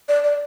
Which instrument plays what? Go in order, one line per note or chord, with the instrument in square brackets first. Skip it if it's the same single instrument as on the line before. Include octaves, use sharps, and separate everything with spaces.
[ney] D5
D5